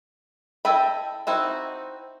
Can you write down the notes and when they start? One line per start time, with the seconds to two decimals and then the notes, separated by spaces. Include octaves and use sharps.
0.65 E4 A4 D#5 G5 B5
1.27 C4 D#4 E4 F#4